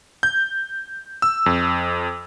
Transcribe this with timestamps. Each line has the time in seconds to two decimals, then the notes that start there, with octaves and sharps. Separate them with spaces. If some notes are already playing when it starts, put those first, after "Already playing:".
0.23 G6
1.22 E6
1.46 F2